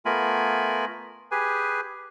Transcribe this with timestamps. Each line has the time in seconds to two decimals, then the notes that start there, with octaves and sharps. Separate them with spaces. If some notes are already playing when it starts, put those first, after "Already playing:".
0.05 A3 B3 F4 A#4 G#5 B5
1.31 G4 G#4 B4 G#5